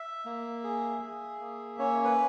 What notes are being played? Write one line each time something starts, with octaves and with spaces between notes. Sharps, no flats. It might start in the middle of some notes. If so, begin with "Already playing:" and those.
Already playing: E5
A#3
G#4
G#4
A#3
C#4 C#5
B4